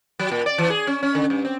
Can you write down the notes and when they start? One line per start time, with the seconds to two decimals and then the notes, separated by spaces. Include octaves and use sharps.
0.19 F#3
0.31 A#2
0.46 D5
0.58 E3
0.70 G#4
0.87 C#4
1.03 C#4
1.15 D3
1.30 G2
1.45 C4